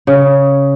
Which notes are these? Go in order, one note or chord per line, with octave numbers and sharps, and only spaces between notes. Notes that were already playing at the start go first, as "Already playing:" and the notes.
C#3